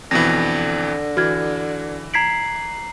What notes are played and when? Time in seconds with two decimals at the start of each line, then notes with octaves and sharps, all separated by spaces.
0.11 F2 B2 D3 E3 A#6
1.17 E3 F#4 F6 G#6
2.14 A#5 G#6 B6 C7 D7 F#7